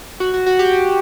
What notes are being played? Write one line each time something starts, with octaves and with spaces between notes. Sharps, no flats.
F#4
F#4
F#4
G4
F#4